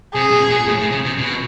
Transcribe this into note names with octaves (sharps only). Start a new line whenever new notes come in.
C3 G#4
B2
A#2
A2
A2
C#3
C3
B2